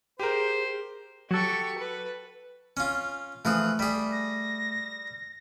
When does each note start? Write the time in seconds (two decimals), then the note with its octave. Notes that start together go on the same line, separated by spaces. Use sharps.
0.20 G4 G#4 A#4 C5
1.31 F#3 F#4 G4 A4 C#6
1.78 B4
2.77 C#4 F4
3.45 E3 F3 A3 G#4 F#6
3.79 G3 G#4 B6
4.12 A#6